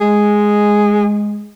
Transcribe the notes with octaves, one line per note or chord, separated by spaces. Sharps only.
G#3 G#4